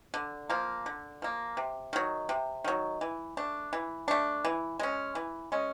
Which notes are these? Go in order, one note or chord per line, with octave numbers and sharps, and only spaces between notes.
D3
F3 A#3
D3
F3 A#3
C3
D#3 F#3
C3
D#3 F#3
E3
A3 D4
E3
A3 D4
E3
G#3 C#4
E3
G#3 C#4